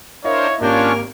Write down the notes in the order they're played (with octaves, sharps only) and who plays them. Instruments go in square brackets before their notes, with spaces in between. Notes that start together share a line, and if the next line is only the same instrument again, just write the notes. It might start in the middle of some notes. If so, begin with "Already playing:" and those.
[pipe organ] D4 A#4 C5 [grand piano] E4 D#5 F5 [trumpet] C#5
[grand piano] G#1 G4 G6 [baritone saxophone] A#3 [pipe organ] C#4 F4 C#5 [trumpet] D4